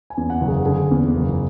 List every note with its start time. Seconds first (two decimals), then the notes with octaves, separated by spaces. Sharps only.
0.10 G#5
0.17 E2
0.30 F#5
0.41 F#1
0.48 G#4
0.66 D3 G#4
0.91 E2
1.15 F#1